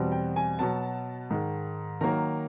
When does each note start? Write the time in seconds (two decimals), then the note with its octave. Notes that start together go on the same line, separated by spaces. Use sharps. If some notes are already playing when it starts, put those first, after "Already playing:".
Already playing: E2 B2 G3 C4
0.12 G5
0.36 G#5
0.59 B2 F#3 B3 A5
1.30 G#2 D#3 G#3
2.01 D#3 F#3 A#3 A#5